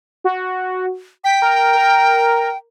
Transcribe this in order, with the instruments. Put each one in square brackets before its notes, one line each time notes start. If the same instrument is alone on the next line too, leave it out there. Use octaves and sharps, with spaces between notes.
[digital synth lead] F#4
[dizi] G5 [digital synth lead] B6
[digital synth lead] A#4
A#4